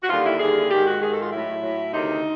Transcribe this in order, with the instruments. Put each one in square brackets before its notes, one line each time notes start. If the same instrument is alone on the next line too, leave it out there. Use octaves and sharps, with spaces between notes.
[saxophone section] F#4
D#2 D3 G3 F4
E4
D#2 D3 G3 G#4
G#2 D#3 G#3 G4
F#4
G#2 D#3 G#3 G#4
A4
F4
A2 F#3 E4
A2 F#3
D2 C3 D#3 D#4